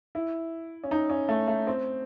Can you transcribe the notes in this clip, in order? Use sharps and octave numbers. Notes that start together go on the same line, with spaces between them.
E4
C#4
D#4
C#4
A3
A3
C4